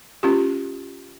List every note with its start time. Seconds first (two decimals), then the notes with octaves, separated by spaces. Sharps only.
0.23 C#4 F4 G4